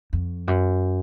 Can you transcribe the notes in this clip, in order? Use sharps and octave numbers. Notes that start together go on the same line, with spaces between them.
F2
F#2